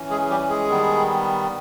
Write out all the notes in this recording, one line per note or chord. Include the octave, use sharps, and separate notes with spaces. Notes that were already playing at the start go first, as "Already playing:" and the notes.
Already playing: E3 C#4
G#3 G#4
G3 G4
G#3 G#4
D#3 G3 B3